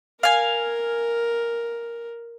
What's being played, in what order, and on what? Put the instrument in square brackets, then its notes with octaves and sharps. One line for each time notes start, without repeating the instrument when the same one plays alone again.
[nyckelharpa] A#4 [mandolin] F5 G#5